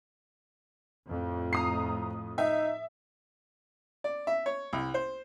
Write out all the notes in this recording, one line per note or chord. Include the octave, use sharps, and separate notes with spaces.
F2 A2
A#5 D#6 C7
D#4 E5
D5
E5
C#5
C2
C5